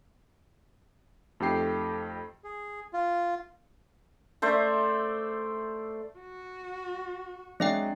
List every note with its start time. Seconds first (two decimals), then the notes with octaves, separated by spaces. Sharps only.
1.40 F2 A3 D#4 G4 G5 C7
2.44 G#4
2.93 F4
4.42 A3 C5 D5 E5
6.19 F#4
7.60 F#3 G#3 C4 D4 E5 G5